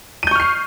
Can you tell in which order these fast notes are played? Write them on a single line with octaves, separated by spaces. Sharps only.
D#7 G6 C#6 F6 C7